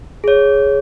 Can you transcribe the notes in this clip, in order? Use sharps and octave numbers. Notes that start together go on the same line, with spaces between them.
G#4 C#5